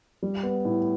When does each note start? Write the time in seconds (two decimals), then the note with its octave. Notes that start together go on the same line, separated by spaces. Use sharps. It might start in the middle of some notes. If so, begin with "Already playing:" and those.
0.23 G3
0.43 B3
0.65 A2